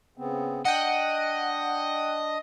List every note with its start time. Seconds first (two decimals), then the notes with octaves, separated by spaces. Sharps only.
0.17 C#3 B3 C4
0.65 D4 D#5 F#5 G5